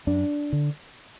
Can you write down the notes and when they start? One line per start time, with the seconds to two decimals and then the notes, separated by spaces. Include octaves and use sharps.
0.07 F#2 D4
0.53 D3